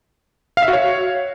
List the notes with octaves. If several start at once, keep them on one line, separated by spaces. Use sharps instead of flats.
F5
E5
F#4
C#5